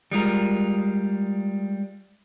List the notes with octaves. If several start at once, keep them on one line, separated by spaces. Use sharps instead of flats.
G3 G#3 F4 A#4